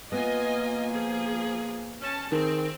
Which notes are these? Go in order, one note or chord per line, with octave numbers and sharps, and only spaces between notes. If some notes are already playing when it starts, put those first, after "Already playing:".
A#3 B3 F4 D#5 G#5
F3 G#4
C#4 A5
D#3 C4 G#4